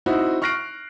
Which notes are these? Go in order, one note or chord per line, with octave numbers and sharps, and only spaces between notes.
C4 D#4 E4 F#4
C#6 F6 F#6 A#6 C7 D7